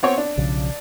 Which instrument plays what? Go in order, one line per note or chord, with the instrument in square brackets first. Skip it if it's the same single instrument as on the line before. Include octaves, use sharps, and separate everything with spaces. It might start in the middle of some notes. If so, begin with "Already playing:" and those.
[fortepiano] B3 C4 C#5
D4
[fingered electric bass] B1 C#3 F3